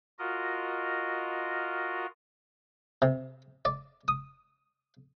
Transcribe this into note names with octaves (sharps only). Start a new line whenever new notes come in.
F4 F#4 A#4 D#5
C3
D5
D#6